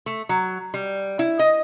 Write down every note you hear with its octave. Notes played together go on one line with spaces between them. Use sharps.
A3
F#3
G3
E4
D#5